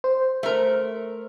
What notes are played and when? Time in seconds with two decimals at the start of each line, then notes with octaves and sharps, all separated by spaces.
0.04 C5
0.43 A3 A#4